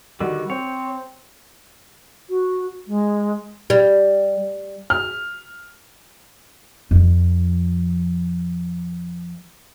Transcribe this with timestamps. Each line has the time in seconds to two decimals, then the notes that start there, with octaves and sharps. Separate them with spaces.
0.20 D3 D#3 G3 F#4
0.50 C4 C#5
2.29 F#4
2.87 G#3
3.70 G3
4.90 F6
6.91 F2 F3